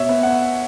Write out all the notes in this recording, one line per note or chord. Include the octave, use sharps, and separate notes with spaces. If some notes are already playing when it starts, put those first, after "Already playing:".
Already playing: B2 C#5 E5
B3
F#5